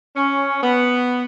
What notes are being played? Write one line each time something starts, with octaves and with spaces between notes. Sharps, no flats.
C#4
B3